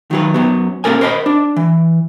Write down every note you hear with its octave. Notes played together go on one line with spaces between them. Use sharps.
D#3 F#3 B4
F#2 F#3 B3
A#3 C#4 A4 A#4 G#5
A#4 C5 D#5 A#5 B5
D4
E3